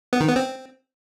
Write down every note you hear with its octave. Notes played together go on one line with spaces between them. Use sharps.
B3
D#3
B3
C4